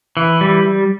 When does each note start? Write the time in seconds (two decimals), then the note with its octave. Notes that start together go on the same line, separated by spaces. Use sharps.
0.17 E3
0.41 G3